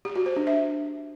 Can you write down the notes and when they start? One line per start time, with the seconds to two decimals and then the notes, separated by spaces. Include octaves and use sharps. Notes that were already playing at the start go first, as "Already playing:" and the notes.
0.05 G4
0.15 F#4
0.26 C5
0.36 D4
0.47 E5